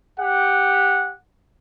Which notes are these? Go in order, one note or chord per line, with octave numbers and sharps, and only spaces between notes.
G4 F#5